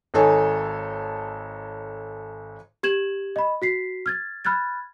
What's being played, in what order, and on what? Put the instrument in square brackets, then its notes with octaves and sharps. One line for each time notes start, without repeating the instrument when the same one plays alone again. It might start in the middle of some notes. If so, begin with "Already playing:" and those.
[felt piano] G#1 D#4 A4 C#5 G#5
[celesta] G4 G#6 E7 F#7
D#5 B5
F#4 B6 C7
F6 G#6 A6
B5 F6 F#6 G#6 A6